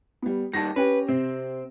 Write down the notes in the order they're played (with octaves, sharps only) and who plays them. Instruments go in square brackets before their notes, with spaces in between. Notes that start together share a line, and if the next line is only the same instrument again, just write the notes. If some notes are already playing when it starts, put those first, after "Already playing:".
[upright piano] G3 B3
[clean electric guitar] D#2 D#3 G3 [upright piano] A5 A#6
[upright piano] C#4 G4 [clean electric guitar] B4
[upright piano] C3 [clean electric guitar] C4